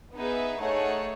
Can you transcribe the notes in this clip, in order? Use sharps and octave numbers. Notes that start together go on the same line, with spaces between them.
B3 D#4 G#4 B4 E5
A3 D#4 G#4 C#5 F#5